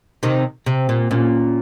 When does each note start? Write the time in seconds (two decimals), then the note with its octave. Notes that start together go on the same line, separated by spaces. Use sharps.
0.23 C3 D#3
0.66 C3
0.89 A#2
1.10 A#2 C#4 F4